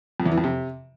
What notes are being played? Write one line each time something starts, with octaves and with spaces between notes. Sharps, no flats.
F2
E2
E3
F2
C3